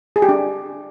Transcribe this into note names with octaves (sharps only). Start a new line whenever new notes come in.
G#4
G4
D4